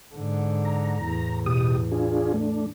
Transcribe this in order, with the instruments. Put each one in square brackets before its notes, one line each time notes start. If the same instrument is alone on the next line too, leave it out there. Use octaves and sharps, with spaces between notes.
[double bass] G#2 D3
[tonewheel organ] A#5
[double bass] E2 A2
[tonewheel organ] B2 G4 D#6
D4 F4 G#4
A3 D4